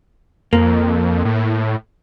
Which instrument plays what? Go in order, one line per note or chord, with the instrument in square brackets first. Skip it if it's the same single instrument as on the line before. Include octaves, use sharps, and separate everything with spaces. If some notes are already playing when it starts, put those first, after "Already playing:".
[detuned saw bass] F2 [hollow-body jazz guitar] A#3
[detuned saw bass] A2